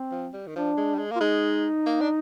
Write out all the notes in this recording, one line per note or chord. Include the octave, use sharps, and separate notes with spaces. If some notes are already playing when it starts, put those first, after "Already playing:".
Already playing: C4
F3
G3
D#3
F3 D4
G#3
G3
G#3
A#3
F4
G#3 D#4
A#3
D4